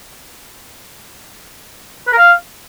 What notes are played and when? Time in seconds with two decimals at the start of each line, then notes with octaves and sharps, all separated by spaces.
2.07 B4
2.12 A#4
2.17 F5